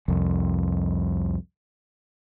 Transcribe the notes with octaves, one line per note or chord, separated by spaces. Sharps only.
C2 F2